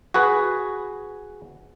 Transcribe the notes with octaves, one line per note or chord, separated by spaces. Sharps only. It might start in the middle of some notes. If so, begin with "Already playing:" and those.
F#4 G#4 B4